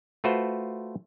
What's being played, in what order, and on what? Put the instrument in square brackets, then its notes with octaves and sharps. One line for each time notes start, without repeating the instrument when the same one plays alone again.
[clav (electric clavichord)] A3 F4 F#4 B4 C5